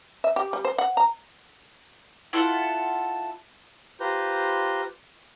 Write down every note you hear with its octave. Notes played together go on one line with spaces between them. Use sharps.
E5
G4
G3
C5
F#5
A#5
E4 F4 A4 F#5
F4 G4 B4 C5 A#5 G6